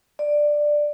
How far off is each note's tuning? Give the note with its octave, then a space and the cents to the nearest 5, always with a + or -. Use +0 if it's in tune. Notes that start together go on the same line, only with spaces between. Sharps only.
D5 +10